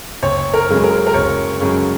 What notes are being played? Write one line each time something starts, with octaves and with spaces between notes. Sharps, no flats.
F#1 C#5
A#4
F#2 C#3 G#3 C#4
A#4
A#4
F#1 C#5
F#2 C#3 G#3 C#4